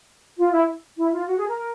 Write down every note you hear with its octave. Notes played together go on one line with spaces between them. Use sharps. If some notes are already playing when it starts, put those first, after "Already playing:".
F4
E4
E4
F4
F#4
G#4
A#4